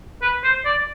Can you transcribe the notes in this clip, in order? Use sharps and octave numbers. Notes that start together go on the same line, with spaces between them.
B4
C5
D5